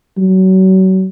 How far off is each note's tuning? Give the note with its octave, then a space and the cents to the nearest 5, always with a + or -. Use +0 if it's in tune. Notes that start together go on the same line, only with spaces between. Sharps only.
F#3 +30